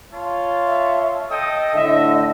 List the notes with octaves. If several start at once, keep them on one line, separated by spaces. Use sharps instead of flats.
F4 C#5 A5
E5
A4 D#5 G5 D#6
A2 D3 E5